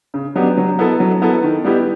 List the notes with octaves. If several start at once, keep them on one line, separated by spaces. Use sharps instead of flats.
C#3
F#3 B3 D4 G4
F#3
B3 E4 A4
F#3
B3 E4 A4
D#3
G3 B3 E4 G4